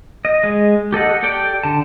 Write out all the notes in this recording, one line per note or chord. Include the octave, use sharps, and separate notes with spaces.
D#5
G#3
G4 A4 D#5 F#5
G4 A4 D5 G5
D3 A5